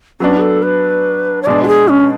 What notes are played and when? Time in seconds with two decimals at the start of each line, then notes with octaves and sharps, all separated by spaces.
0.20 F#3 B3 C#4 D4
0.37 G#4
0.41 A4
0.62 B4
1.42 C#5
1.46 B2 G#3 D4 D5
1.63 F#4
1.67 G#4
1.88 C#4